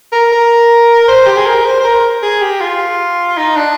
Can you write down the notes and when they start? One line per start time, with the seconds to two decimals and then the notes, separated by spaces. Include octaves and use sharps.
0.12 A#4
0.32 A#4
1.08 C5
1.26 G4
1.36 G#4
1.46 A#4
1.65 C5
1.80 C5
1.84 A#4
2.22 G#4
2.41 G4
2.60 F4
3.37 D#4
3.56 D4